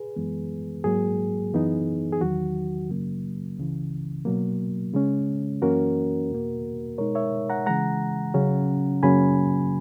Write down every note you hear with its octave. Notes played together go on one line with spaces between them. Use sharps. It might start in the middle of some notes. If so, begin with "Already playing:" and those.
Already playing: G#4 B4
F#2 E3 G#3 B3
G#2 F#3 A#3 G#4
F#2 E3 B3 D#4
G#4
E2 D#3 F#3 F#4
F#2 C#3 F#3 A#3
C#2 C#3 E3
B2 F#3 A#3
C#3 G#3 C#4
F#2 E3 A#3 C#4 F#4 A#4
E2 B2 A#3
B2 G#3 D#4 A#4 C#5
C#5 E5
F#5 A#5
C#3 E3 G#3 F#5 A#5
C#3 F#3 C#4
F#2 C#3 F#3 A#3 C#4 G#5 B5